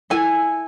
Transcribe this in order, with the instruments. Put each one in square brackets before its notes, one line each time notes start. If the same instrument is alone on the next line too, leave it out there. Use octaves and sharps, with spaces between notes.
[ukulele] E4 A4 G#5